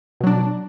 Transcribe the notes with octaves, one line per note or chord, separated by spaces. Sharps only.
B2 F#3 D4